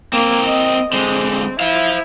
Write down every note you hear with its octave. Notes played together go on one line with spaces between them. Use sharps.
A#3 C4 A#4
D#5
D3 G#3 C4
E4 C5 F5